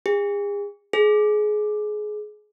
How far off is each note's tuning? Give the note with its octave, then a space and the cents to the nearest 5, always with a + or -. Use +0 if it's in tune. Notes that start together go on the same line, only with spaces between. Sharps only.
G#4 -40
G#4 +25